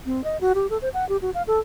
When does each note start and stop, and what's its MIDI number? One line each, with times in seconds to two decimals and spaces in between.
0.06 0.24 60
0.24 0.40 75
0.41 0.53 66
0.55 0.67 67
0.70 0.78 69
0.82 0.89 72
0.94 1.07 78
1.09 1.17 67
1.22 1.30 66
1.34 1.42 77
1.47 1.59 69